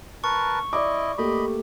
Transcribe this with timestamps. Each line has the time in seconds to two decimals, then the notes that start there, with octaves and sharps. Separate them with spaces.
0.24 A#4 B4 A5 C#6
0.73 E4 D5 D#5 D6
1.18 A3 A#3 G4 D#5 B5